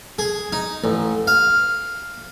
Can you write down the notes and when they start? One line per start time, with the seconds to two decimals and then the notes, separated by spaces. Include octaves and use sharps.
0.19 G#4
0.52 D#4
0.84 A1
1.27 F5